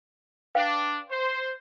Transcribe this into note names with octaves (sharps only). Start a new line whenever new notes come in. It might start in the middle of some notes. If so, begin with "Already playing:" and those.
D4 B4 F5 G5
C5